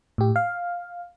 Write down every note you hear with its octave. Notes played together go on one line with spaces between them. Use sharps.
A2 G4
F5